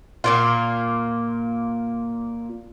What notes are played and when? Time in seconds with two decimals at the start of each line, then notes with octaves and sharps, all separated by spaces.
0.24 A#2 A#3 F4